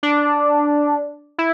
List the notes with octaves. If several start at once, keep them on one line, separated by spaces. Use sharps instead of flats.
D4
E4